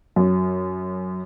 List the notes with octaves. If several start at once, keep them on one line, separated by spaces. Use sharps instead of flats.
F#2